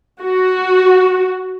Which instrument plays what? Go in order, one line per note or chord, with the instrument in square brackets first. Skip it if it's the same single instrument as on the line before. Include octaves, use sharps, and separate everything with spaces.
[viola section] F#4